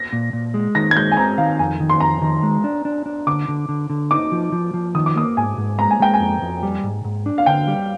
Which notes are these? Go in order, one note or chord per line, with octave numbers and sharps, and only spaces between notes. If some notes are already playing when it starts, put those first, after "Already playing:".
Already playing: A#6
A#2
A#2
G#3
D#3 A#6
G#6
G#3 G6
G#5
C4 A#5
D#3 F5
F2 G#5
D#3
C6
F2 A#5
D#3
G#3
D4
D4
D4
D3 D6
D3
D3
D3
D#4 D6
F3
F3
F3
D#3 D#6
D6
A#3 D#6
G#2 G#5
G#2
G#3 A#5
G#5
G#3 G5
G#5
F2
F2
G3
G#2
G#2
D4
F5
D3 G5
G3